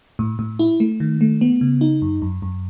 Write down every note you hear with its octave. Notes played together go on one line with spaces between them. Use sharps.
A2
A2
E4
A3
D#3
A3
B3
C#3
D#4
F#2
F#2
F#2